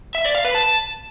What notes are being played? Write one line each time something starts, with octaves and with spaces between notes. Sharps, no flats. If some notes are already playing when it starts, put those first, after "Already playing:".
E5
D5
F5
B4
A5